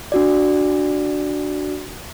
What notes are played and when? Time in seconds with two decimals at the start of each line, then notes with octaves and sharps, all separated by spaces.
0.12 D4 F#4 D5